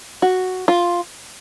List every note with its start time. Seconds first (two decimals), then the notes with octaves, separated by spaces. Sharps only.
0.22 F#4
0.68 F4